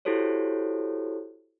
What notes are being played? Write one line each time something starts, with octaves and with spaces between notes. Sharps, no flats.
E4 F#4 G4 A4 C5 C#5